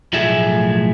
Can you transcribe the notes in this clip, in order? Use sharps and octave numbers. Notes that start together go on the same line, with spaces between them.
B1 A2 F3 A3 G#4 E5